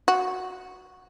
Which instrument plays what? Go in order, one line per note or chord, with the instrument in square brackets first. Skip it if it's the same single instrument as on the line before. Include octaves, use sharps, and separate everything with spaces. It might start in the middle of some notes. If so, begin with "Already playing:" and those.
[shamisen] F#4